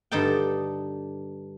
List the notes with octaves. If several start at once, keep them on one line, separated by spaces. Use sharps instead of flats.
G2 D3 D#4 A4 G5